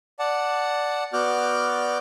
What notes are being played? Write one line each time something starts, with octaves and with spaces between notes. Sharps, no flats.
D5 F#5 A5
B3 F#4 D5 D6 F6 G6